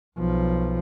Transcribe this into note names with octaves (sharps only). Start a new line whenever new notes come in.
B1 F3